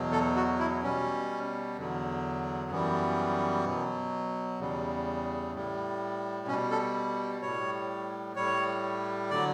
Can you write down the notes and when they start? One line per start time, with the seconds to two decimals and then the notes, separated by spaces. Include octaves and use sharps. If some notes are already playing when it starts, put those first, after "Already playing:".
Already playing: E2 B2 F#3
0.12 A4
0.36 F#4
0.59 E4
0.83 B2 G3 C#4
1.77 E2 D3 F#3
2.71 F#2 E3 G3 B3
3.65 B2 F#3
4.59 E2 C#3 G3
5.54 A2 G3
6.47 B2 C#4
6.51 G3
6.71 A4
7.42 A2 G3 C#5
8.36 A2 G3 C#5
9.30 D3 F#3 D5